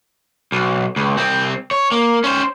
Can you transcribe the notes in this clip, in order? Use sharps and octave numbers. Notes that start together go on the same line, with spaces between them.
B1
C#2
C2 C4
C#5
A#3
C#4 C5